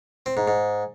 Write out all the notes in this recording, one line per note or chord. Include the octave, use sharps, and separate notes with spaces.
C4
G#2
G#2